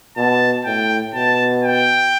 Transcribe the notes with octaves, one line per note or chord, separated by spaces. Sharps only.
B2 A5
A2 G5
B2 A5
G5